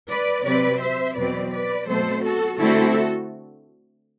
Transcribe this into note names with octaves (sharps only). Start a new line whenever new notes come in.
B4 D5
C3 F#3 C4 B4 D5
C5 E5
E2 B2 F#3 C4 B4 D5
B4 D5
B2 F#3 A3 C4 A4 C5
F#4 A4
D3 A3 C4 E4 F#4 A4